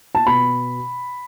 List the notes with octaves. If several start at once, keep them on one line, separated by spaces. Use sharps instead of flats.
A5
B2 B5